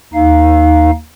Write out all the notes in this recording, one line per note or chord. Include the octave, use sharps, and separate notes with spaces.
D#2 D#4 F5